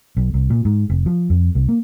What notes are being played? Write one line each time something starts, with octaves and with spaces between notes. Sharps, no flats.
B1
C2
A#2
G#2
F1
F3
F2
C2
A#3